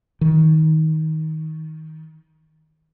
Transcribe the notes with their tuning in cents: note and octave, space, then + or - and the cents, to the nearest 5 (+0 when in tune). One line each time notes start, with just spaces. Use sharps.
D#3 +20